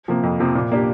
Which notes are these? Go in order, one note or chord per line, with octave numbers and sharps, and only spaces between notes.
C3 F3 A#3
F2
C3 F3 A#3
A#2
A#3 D4 G4